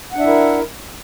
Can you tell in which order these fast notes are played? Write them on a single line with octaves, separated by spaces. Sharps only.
F#5 D4 E5 E4 A#4